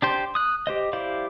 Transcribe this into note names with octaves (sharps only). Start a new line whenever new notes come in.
D4 G4 C5
D#6 F#6
G4 C5 D#5
E4 G4 C5 D5 F5